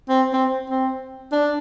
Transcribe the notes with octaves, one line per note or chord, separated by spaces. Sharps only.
C4
C4
C4
D4